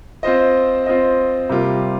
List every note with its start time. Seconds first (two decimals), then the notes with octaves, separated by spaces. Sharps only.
0.23 C4 F4 C5 D#5
0.86 C4 F4 C5 D#5
1.49 C3 G3 A#3 F4